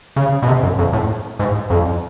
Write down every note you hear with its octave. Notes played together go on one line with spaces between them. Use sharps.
C#3
B2
C3
F#2
F2
A2
G#2
F2